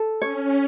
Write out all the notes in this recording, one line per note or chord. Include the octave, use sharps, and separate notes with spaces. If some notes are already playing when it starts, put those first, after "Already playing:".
Already playing: A4
C#4 C#5